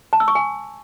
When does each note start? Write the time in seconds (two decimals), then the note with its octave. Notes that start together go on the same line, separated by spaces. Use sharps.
0.13 A5
0.20 E6
0.28 C#6
0.35 G#5